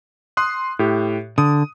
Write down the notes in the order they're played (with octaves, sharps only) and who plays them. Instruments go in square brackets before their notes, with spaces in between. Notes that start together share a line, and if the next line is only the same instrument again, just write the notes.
[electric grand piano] C6 D#6 F#6
A2 G4
[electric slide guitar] D3 [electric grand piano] D#6